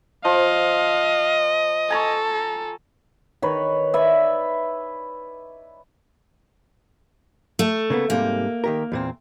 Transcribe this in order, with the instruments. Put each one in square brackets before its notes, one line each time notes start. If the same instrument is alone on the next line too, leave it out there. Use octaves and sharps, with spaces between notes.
[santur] F3 [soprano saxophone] D#5 [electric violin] F5
[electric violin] A4 [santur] G#5 A#5 C#6
[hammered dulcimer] D#3 B4 C#5
B4 D5 E5 G#5
[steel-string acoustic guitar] A3
[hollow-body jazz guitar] C#3 A#3 B3
[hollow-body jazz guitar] G#2 C3 G3 [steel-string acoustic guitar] A#3
[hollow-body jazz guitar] D#3 G4 A#4
E2 A#2 C4